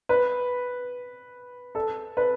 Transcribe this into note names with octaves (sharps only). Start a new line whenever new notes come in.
B4
A4
B4